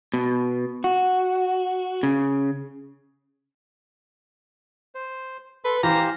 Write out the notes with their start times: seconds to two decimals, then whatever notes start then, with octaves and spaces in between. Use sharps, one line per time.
0.14 B2
0.84 F#4
2.03 C#3
4.95 C5
5.65 A4 B4 C6
5.83 E3 G4 C5 F5 A#5